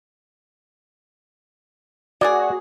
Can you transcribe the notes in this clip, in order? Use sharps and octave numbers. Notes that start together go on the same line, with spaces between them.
F#3 A#3 F#4 G#4 D5